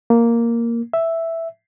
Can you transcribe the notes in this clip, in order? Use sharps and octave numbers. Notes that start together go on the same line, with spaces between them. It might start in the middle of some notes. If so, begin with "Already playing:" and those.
A#3
E5